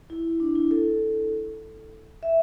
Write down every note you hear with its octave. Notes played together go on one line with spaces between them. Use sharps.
E4
D4
E4
A4
E5